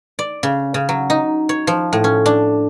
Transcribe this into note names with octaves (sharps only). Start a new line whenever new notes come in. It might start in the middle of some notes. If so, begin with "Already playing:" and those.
D5
C#3
C#3
F#3
D#4
C#5
F3
A2
C#4
D4